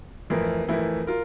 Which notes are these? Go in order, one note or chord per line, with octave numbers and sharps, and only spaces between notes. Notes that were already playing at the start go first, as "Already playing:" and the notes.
F2 E3 A3 E4 A#4
F2 E3 A3 E4 A#4
F4 A#4